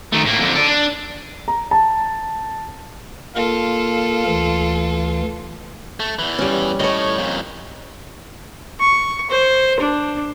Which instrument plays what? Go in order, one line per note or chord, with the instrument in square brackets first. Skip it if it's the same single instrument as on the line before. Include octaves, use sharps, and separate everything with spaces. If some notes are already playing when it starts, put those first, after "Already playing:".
[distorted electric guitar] D#3 A3
A2 A#3
F2 D3
A4 D5
D4
[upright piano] A#5
A5
[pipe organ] A#3 A#4 [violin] F4 A4
[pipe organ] D2 E3
[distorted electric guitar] A3
E2 E3
[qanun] G3 C#4
[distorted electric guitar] A2 [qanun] C#5 D#5
[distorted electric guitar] F2 A#2
[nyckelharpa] C#6
C5
D4